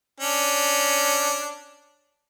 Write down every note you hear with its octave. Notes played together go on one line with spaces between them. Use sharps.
C#4 D4